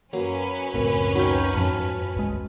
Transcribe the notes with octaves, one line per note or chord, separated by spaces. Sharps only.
F#2 F#3 A#3 C#4 B4
C#2 A2 C4 A#4
F#3 D#4 G5 C#6 F6
F2 G#2 F3 A5 F6
G#1 D2 G#3